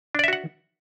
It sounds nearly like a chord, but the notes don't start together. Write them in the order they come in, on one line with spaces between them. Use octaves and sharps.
D4 D5 E5 F#4 F#5